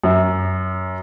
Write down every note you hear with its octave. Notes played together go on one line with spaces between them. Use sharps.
F#2